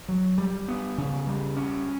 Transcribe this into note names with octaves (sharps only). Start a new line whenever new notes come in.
F#3
G3
B3
C#3
G3
C#4